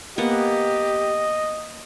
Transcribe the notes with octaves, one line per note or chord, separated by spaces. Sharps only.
A#3 B3 G4 D#5 F#5